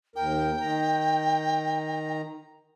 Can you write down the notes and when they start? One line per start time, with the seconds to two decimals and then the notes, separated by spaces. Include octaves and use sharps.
0.16 D#2 A#4 G5
0.61 D#3 A#5